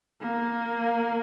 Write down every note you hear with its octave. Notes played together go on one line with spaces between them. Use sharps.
A#3